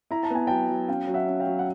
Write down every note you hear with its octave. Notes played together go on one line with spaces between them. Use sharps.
E4 A#5
A5
B3 G#5
F#3 G5 A5
F#3
C#4 F5 G5
F#3
E5 F#5
C#4
F5 G5
F#3
F#5